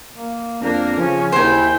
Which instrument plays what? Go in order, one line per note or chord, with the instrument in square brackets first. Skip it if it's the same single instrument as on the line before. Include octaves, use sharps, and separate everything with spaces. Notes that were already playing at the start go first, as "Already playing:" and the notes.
[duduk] A#3
[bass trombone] F2 [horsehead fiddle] A#3 A#4 [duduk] D4
[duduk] C#3 [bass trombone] F3 [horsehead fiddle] C#4
[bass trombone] D#2 [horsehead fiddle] E4 G5 [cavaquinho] C5 G#5